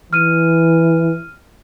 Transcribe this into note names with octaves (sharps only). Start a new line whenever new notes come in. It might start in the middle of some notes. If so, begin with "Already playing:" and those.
E3 F6 D#7